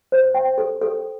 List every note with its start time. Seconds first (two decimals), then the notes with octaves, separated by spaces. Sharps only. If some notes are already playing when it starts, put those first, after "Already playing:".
0.12 C5
0.34 G5
0.58 A4
0.81 A4